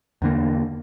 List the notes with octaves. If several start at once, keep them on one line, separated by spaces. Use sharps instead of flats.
E2 D3 A#3